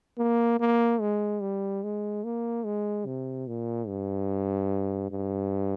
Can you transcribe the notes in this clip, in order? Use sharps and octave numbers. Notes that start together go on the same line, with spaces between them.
A#3
A#3
G#3
G3
G#3
A#3
G#3
C3
A#2
G2
G2